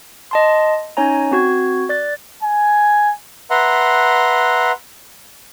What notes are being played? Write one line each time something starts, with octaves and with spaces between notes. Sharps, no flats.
D#5 A5 C6
C#4 D#4 C#5 G#5 A#5
C4 F#4 G#6
D5 F#6 A6
G#5
B4 E5 F#5 A#5 C6